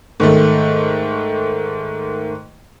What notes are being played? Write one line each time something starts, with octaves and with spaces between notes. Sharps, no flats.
G#2 D#3 A3